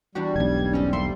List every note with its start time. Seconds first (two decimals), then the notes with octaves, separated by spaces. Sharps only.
0.15 E2 G3 D4 F#4 G4
0.36 E1 B1 G#6
0.73 A2 C4 C#4
0.93 A#3 A4 E5 C6